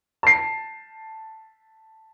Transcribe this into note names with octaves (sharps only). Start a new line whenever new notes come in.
A5 C7